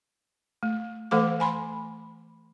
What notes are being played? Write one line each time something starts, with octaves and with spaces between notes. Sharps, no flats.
A3
E3 A3 A4 C5 F#5 D6
G#5 B5 C6